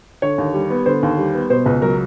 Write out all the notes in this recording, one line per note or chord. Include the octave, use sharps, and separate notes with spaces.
D3 C#5
D#2
G3
B3
D3 C5
D#2
G3
B3
B2 C5
C#2 B4
F#3 A#4